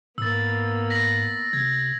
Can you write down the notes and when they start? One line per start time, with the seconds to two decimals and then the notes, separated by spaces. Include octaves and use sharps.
0.18 G#2 A#3 B3 E6 A6
0.90 A#6 B6 F#7
1.53 C3 G#6